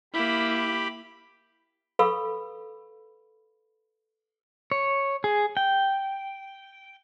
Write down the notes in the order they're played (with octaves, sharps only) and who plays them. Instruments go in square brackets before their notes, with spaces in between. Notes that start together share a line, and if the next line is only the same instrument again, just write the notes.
[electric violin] A#3 E4 [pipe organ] G4 B5
[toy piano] A4 B4 F5 B5 C#6 E6
[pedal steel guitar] C#5
G#4
G5